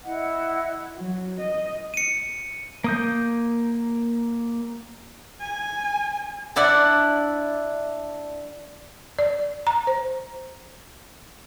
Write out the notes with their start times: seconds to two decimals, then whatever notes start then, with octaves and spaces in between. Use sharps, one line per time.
0.04 E4 D#5 F#5
0.98 F#3
1.40 D#5
1.94 C#7 D#7
2.84 A#3 D#6 G6
5.40 G#5
6.56 D4 E4 D5 F#5
9.19 D5
9.67 A#5
9.87 C5